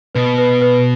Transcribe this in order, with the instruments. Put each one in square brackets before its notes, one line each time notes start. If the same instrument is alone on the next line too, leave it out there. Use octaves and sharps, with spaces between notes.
[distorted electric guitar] B2 [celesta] B4
[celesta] B4
B4